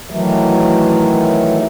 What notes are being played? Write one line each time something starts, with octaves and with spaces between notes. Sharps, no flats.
D#3 E3 F#3 A3